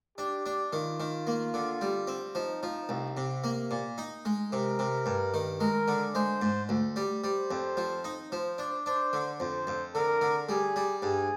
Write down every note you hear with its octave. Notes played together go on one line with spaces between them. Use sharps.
D4 G4
D4
D#3 F4
D#3
A#3
D3
G3
C4
F3 D#4
F3
C2
C3
A#3
A#2
D#4
G#3
C3 A#4
C3
G2
D#3
G#3 A#4
D3
G#3 C5
G#2
D2
G3
G3 C5
F2
F3
D#4
F3 C5
D4
D4 C5
D3
F2 C5
F2
D3 A#4
D3
G3 G#4
G3
G2 G#4